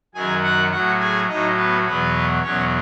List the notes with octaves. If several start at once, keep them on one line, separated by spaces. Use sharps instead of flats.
F#2 D#3 F#3 G#4 G#5
F#4 F#5
A2 F#3 F#4 F#5
G#4 G#5
A2 F#3 D#4 D#5
B3 B4
E2 B2 F#3 B3 B4
E2 B2 F#3 C#4 C#5